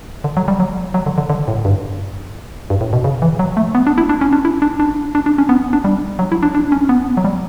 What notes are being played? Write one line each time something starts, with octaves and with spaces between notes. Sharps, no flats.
D3
F#3
G3
F#3
F#3
D3
D3
D3
A2
G2
G2
A2
B2
C#3
E3
F#3
A3
B3
D4
E4
D4
C#4
D4
E4
D4
D4
D4
D4
C#4
B3
D4
G3
F#3
E4
D4
D4
C#4
B3
F#3
G3